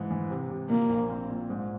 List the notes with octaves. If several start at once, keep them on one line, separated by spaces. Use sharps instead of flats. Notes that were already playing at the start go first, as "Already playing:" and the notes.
Already playing: G#2 E3
E3
C3
C3
A#2 A#3
A#1
C4
A#2
G#2